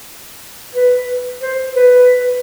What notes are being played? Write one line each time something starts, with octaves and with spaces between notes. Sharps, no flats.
B4
C5
B4